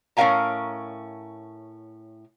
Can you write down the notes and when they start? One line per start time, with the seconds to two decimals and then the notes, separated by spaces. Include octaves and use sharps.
0.17 A2 C#4 A#4 F5 G#5 A#5